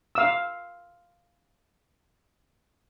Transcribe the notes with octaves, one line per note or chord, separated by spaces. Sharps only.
F5 E6